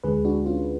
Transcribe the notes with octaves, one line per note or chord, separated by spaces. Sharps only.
D2 D3 G#3 G#4 B4
D4 F#4
C#4 F4